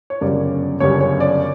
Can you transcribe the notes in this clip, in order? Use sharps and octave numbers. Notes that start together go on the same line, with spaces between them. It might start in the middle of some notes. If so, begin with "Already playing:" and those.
C#5
G1 F#2 C#3 G3 D5
G1 F#2 C#3 G3 C#5
C#5
D5